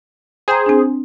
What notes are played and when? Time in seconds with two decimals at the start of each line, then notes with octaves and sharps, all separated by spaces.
0.48 G#4 C5 G5 A#5
0.66 C4 D4